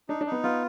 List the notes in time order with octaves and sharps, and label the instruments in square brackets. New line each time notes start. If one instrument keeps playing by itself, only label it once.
[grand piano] D4 [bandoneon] D#4
[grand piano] D4
[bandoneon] D#4
[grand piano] B3
[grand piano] B3 [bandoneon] F4